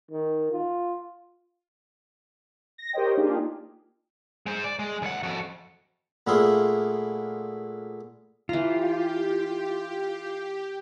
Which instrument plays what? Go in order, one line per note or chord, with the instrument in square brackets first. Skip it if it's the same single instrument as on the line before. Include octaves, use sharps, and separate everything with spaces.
[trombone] D#3
F4
[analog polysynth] A#6
G4 A#4 C5 C#5 D#5 G5
A#3 D4 D#4 F4 G4 G#4
[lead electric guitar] G#3 C5
D5
G#3
D#2 F#5
F2 F#4
[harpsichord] A#2 A3 B3 E4 F4 G#4
[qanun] E3 A#5 [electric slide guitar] F4 [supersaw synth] G4